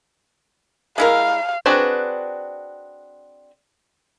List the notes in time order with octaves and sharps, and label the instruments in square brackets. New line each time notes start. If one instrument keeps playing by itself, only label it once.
[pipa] G#3 E4 A#4 [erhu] F5
[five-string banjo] C4 D4 F#4 G#4 B4